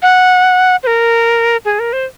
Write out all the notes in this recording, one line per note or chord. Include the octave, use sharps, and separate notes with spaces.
F#5
C5
A#4
G#4
A#4
C5